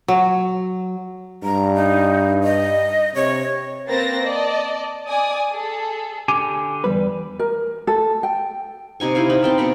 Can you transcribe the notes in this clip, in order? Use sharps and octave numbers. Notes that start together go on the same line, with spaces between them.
F#3
G2 A#5
D#4
D#5
C3 C#5
A#3 C4 B4 C5 A6 A#6
D5 D#5 A5
D5 G#5 D#6
G#4 A4
D3 G4 G#5
E2 G3 B4
A#4
A4
G5
C3 D#4 G#5 C#6
E4 C5 F5 G#5
D#4 B5
C4 G5 A5
B2 A#3 C4 B5